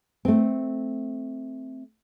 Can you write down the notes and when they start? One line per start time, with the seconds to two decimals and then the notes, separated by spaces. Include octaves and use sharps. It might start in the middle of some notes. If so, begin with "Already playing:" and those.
0.25 A3 C4